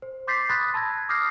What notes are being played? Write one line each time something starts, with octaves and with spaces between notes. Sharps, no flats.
C5
C6 D6 G6 A6 B6 C7
B5 C6 D#6 F#6 A6 B6
A5 B5 E6 G#6 A#6
D6 D#6 F6 G6 A#6 C7